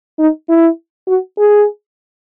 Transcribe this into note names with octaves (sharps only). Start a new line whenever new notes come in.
D#4
E4
F#4
G#4